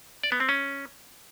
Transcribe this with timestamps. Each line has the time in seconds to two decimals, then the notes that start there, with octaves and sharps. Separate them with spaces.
0.23 D5
0.32 B3
0.40 C4
0.49 C#4